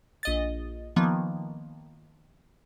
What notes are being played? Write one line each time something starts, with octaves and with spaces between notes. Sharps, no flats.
A#1 D#5 A6
D#3 F3 A#3 B3